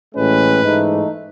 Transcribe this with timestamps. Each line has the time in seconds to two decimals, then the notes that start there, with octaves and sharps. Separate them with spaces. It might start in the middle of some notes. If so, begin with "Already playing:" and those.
0.14 A1 A2 G#3 C#4 B4
0.62 G#2 E3 A3 D#4